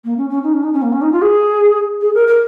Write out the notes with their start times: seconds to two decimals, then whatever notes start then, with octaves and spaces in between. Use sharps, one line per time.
0.04 A#3
0.17 C#4
0.30 C#4
0.43 D#4
0.53 C#4
0.63 D#4
0.73 C#4
0.82 A#3
0.92 C#4
1.02 D#4
1.12 F4
1.22 G#4
2.01 G#4
2.14 A#4
2.27 A#4